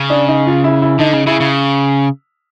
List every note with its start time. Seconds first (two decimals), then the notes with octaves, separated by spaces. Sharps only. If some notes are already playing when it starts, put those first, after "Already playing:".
Already playing: C#3
0.10 D4
0.28 D#4
0.47 F4
0.64 E4
0.82 E4
1.00 D3 D#4
1.14 C#3
1.27 C#3 E4
1.40 C#3